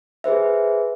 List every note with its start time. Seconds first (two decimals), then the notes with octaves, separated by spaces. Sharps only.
0.24 G#4 B4 C5 E5